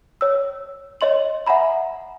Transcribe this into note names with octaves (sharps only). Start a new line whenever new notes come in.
C#5 E6
C#5 D#5 C6 F#7
E5 F#5 G#5 A#5 B5